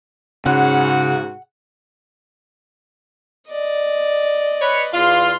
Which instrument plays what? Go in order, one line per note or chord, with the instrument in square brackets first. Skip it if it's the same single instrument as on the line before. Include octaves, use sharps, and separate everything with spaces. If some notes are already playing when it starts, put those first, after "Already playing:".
[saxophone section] G#2 F#4 [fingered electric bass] C#3 [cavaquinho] F#5
[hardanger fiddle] D5 D#5
[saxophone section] B4 C#5
[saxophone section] E2 F4 [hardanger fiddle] C6